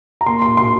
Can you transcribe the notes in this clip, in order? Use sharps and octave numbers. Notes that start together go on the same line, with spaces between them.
A#5
A#3 C6
C6
C6